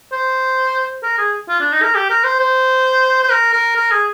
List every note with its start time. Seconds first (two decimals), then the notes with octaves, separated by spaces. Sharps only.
0.13 C5
1.03 A#4
1.18 G#4
1.49 F4
1.61 D4
1.72 D#4
1.83 A#4
1.95 G4
2.10 A#4
2.24 C5
2.40 C5
3.24 C5
3.31 A#4
3.53 A#4
3.76 A#4
3.92 G#4